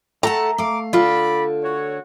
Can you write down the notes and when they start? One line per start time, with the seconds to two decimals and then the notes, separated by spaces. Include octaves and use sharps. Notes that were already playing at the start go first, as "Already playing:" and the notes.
0.23 A3 A4 F#5 A5 A#5
0.58 A3 F5 D6
0.93 D3 F4 A4 D5 B5
1.63 F#4 C#5